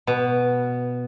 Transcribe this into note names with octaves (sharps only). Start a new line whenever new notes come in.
B2